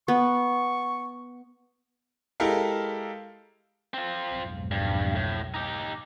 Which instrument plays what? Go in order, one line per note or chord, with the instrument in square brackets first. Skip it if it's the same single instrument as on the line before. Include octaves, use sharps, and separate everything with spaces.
[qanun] B3 [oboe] C#6
[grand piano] G#3 E4 G4 A4 A#4 F5
[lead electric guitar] C4 F4
[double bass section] B1 F2 G#2
[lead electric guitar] G2
A2
D#4 G4